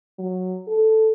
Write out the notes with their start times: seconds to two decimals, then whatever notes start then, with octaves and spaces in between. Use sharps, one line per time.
0.19 F#3
0.67 A4